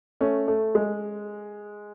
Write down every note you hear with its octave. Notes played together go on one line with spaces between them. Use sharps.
A3 C#4
A3
G#3